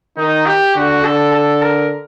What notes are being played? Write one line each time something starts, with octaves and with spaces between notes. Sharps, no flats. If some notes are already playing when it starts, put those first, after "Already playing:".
D#3 D#4
G4
D3 F#4
D3 A4
A4
A#4